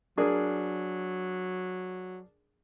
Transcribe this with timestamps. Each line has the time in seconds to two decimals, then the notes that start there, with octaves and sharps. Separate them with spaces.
0.18 F#3 D4 G#4 A#4